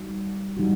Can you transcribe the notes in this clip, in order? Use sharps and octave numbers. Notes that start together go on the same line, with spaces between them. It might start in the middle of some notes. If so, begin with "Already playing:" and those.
Already playing: G3 D#4 F#4
G3 D#4 F#4